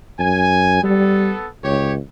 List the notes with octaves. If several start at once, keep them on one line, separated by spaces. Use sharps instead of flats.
F#2 G#5
G3 B3 A4
C#2 G4 C#5